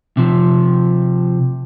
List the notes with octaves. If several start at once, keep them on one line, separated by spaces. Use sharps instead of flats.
C3 F3